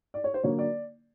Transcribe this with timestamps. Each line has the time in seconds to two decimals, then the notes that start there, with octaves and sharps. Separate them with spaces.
0.14 D5
0.24 C#5
0.34 C5
0.43 D3 F#3 A#3 C#5
0.59 D5